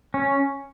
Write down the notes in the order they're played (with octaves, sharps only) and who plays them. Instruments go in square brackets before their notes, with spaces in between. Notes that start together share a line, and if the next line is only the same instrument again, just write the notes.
[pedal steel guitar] C#4